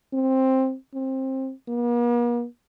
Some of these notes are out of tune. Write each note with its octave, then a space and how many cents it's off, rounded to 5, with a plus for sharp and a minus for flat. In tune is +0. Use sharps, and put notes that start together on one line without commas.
C4 +10
C4 +20
A#3 +45